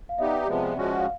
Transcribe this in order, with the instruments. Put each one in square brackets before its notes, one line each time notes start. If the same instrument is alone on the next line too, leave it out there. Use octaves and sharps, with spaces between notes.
[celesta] F5
[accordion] B3 D#4 G4 [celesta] D5 E5
[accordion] C3 F3 G#3 B3
F3 G#3 C#4 F#4
[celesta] F#5
F5